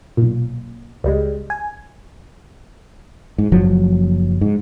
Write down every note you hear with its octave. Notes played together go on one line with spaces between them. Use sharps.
B1 A#2
C#2 G3 G#3
G#5
G#2
F#1 F3 F#3
G#2